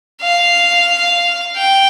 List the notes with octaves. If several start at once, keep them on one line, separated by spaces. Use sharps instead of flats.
F5
G5